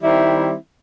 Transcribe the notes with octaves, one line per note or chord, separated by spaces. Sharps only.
D#3 G3 C4 E4